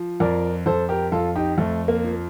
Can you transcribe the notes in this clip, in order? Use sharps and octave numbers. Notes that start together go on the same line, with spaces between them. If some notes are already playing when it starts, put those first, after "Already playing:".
Already playing: F3
F2 A#4 D5
F2 A4 C5
G4 A#4
F2 F4 A4
D#4 G4
F2 A3
A#3
F3